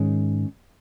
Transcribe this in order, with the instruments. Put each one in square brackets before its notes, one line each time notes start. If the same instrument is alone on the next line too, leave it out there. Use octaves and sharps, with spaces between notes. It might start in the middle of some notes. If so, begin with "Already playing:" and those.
Already playing: [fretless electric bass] G#2 D#3 G#3 C#4